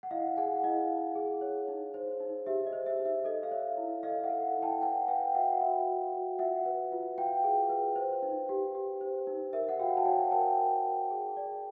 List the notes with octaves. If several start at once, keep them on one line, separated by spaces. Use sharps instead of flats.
F#5
E4 D#5 F5
G#4 F#5 G#5
E4 D#5 F5
E4
G#4
C#5
D#4
C5
D#4
G4 E5
D#5
C5
E5
D#4
E5
A4 D#5
F5
C#5 E5
E4
A4 D#5 F5
E5 F#5
A4
E4
G5 A5
B4 F#5 G#5
B4 F5 G5
F#4 E5 F#5
F#4 E5
F#4
F#4
F4 E5 F#5
B4
F4
F4 F5 G5
G#4
B4
C5
D#4
G4
G4
C5
D#4
A#4 E5
F#5
F#4 F5 G5
A5
C#5 F#5 G#5
A#4 G5 A5
A#4
A#4
G#4
D5